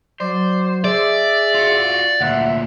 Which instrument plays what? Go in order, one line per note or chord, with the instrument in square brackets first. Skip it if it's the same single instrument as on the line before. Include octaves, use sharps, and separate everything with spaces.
[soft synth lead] F#3 [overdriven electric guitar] C5 [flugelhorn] D5
[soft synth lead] G#4 [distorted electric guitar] D5 [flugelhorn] E5
[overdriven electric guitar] F4 F#4
[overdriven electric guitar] D2 A#2 [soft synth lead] E5 [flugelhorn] F#5